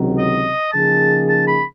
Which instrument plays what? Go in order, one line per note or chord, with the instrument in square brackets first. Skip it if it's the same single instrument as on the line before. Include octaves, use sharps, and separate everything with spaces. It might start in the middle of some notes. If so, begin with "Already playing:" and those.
Already playing: [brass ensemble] C#2 C3 D#3 F#3
[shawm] D#5
[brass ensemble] C#3 F3 A#3 D#4 G#4 [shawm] A5
[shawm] A5
B5